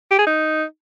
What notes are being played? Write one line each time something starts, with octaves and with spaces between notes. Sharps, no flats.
G4
G#4
D#4